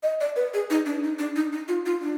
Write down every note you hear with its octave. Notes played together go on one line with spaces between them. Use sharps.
D#5
D5
B4
G#4
D#4
D4
D#4
D4
D#4
D#4
F4
F4
D4